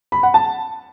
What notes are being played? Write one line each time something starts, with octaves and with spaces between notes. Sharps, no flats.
B5
F#5
A5